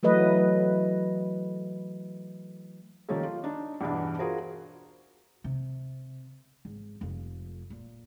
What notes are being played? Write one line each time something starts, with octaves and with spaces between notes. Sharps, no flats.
E3 F#3 A3 B4 D#5
D#3 F3 G3 A#3 C#4 A4
F4
D4 D#4
E2 G2 B2 E3 D4
F4 F#4 G#4 A#4 C5
C3
G#1
F1 F2
A#2